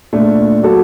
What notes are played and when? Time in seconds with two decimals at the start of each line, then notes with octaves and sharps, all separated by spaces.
0.13 A#2 A3 D4
0.62 F#3 A#3 F#4 A4